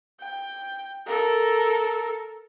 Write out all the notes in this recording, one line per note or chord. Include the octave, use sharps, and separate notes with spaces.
G5
A4 A#4